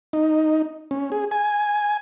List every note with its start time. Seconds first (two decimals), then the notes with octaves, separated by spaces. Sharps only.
0.13 D#4
0.91 C#4
1.12 G#4
1.31 G#5